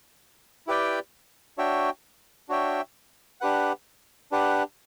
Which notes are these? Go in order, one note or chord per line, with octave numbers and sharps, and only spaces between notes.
E4 G4 B4 D5 G5
D4 F#4 C#5 E5 G5
D4 F#4 C#5 E5 G5
D4 G4 B4 F#5
D4 G4 B4 F#5